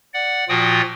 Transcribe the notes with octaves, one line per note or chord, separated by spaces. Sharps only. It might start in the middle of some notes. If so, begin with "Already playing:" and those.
D5 F#5
A#2 F3 F4 F#4 G5 D#6